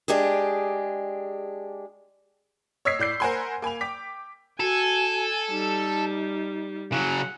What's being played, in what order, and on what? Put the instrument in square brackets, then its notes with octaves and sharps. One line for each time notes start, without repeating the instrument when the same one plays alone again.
[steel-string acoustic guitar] G#3 D4 G4 G#4
[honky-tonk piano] C#5 D#5 E6 G#6 B6 C7
A2 D5 G6 C7
A#4 C5 F#5 G#5 B5 C6
A#3 G#5 B5 F7
G5 D6 B6
[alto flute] F#4 [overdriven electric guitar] A4 [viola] G#5
[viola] G3 [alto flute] D#4
[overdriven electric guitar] C#3 F#3 [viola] F#5